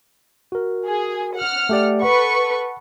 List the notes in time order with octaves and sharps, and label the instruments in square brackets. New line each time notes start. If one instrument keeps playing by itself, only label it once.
[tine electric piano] F#4 A#4
[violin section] G#4
F#5 F6
[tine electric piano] A3 G4 D5
[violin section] A4 B4 C#6 [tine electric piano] F#5